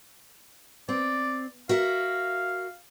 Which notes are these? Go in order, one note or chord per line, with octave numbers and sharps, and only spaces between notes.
C4 D5
F#4 A#4 E5 F5